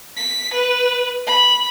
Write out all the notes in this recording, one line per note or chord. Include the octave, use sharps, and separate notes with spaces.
B6
B4
B5